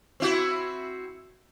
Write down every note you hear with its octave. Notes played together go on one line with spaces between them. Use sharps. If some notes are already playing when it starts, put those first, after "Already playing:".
C4 E4 F#4